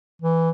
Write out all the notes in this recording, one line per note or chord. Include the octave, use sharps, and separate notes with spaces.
E3